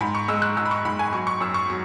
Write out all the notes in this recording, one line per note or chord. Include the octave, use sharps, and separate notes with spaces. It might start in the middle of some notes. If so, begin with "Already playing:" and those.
G#2 B5
C#6
G#3 E6
F#6
G#2 E6
B5
C#6
G#2 B5
G#5
F#3 C#6
C#6
F#2 E6
C#6
F#3